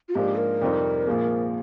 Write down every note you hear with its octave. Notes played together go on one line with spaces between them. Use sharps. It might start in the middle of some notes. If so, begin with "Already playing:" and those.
F4
G#2 F3 A#3 D4 G4
A#4
F2 C3 G3 C4 D#4
A#1 A#2 F3 G#3